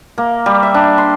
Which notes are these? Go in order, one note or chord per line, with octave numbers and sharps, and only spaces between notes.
A#3
G3
E5
D4
C6